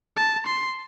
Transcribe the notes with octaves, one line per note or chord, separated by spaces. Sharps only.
A5
C6